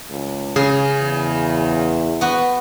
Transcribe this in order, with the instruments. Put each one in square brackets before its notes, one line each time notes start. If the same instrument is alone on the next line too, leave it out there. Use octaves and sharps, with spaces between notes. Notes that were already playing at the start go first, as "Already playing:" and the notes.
[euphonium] C#2
[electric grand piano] C#3 [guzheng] G#4
[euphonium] E2
[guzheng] B3 F#4